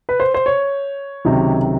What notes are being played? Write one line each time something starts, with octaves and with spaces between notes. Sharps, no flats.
B4
C5
C5
C#5
C#2 C3 D#3 F#3